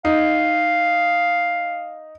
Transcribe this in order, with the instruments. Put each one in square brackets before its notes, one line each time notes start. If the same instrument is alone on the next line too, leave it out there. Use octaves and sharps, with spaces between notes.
[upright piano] D#4 [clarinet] F5